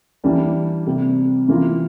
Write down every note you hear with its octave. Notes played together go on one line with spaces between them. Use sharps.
E3 G3 A#3 D4
C3 G3 A#3
E3 A#3 F4